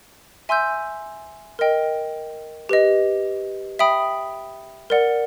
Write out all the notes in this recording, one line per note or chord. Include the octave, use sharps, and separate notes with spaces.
E5 G#5 C6 E6 G6
A#4 D#5 G5
G4 B4 D#5
E5 G5 B5 D#6
A#4 D5 F#5